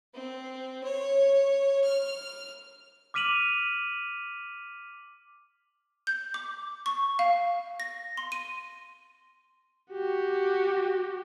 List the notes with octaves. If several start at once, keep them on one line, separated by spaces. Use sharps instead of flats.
C4
C#5
F6
D6 F6 B6 D#7 F7 F#7
G6
D6
C#6
F5
A#6
C6
D#7
F#4 G4